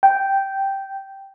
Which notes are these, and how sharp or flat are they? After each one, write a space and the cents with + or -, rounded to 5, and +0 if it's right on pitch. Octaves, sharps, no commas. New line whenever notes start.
G5 -5